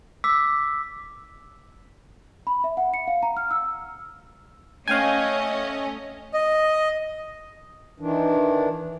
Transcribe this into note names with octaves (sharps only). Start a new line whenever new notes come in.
D6 E6 B6
B5
E5
F#5
C#7
F5
A#5
F6
E6
A3 C#4 D#5 F5 G5 G#5
D#5
D#3 E3 D4